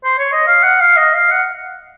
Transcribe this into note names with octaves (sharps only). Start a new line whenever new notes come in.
C5
C#5
D#5
F5
F#5
F5
D#5
F5
F#5